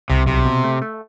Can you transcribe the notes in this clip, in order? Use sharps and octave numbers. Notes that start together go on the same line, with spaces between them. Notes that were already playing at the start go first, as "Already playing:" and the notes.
C2 C3
B1 C3
B2
A3
A3